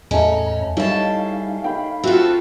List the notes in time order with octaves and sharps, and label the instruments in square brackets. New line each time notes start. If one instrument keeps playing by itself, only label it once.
[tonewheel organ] E2 A2 A#5 [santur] G#3 A3 [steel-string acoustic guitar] C#4
[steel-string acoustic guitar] G3 A5 [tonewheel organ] D#4 F5 [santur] E4 C#5
[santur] G5 B5
[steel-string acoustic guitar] C4 A4 [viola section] F4 F#4 [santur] E5